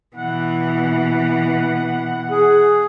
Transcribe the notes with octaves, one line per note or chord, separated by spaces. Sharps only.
B2 E3 F#5
G#4